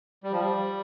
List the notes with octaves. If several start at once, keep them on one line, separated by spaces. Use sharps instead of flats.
G3
F3
G3